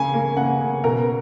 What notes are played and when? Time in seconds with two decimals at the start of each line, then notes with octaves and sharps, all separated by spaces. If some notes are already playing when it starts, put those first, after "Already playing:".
Already playing: C#3 G#5
0.14 A#3
0.37 C#3 F#5
0.61 C#3
0.84 B2 A#4